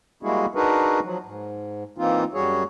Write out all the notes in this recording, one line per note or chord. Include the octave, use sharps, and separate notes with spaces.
G3 G#3 A#3 E4 F#4 G#4
D4 D#4 F#4 G#4 A#4 B4
F3 F#3
G#2
E3 A#3 C4 D#4 F4
F#2 G3 F#4 G#4 C#5